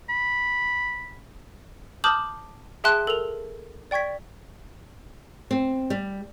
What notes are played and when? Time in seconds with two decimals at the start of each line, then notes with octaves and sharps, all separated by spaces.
0.10 B5
2.04 A5 D6 D#6 F6 G6 F#7
2.84 G#4 E5 G5 A5 C6 F#6
3.07 A4 A#4 F7
3.91 D5 G5 C#6 G#6 B6
5.51 C4
5.90 G3